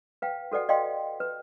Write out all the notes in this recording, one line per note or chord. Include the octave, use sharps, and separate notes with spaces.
B4 F5 G5
F#4 A4 B4 D5 F#5
F#4 D5 D#5 F5 G5 C6
B4